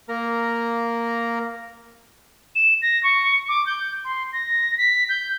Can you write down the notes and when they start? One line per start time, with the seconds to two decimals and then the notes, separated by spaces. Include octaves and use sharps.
0.09 A#3 A#4 A#5
2.55 E7
2.82 A#6
3.03 C#6
3.49 D6
3.66 G6
4.05 C6
4.33 A#6
4.78 B6
5.09 G6